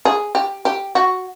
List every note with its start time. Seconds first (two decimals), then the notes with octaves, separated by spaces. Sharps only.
0.05 G#4
0.35 G4
0.65 G4
0.95 F#4